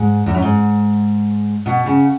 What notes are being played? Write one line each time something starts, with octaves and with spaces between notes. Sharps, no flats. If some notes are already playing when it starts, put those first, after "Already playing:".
Already playing: G#2
E2
F#2
G#2
B2
C#3